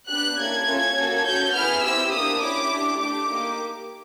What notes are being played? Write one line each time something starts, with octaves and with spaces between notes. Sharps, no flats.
B3 D4 G4 F#6
A#3 C#4 E4 A4 G#6
C#4 F4 A4
A#3 C#4 F#4 A4
C#4 F#4 A4 G6
B3 E4 G#4 F6
C4 E4 G4 E6
A#3 D4 G4 D#6
C#4 E4 G4 D6
D4 G4
A3 D4 G4 D6
A#3 D#4 G4